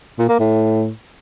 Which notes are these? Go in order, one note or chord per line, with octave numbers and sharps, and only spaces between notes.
A#2
A#3
A2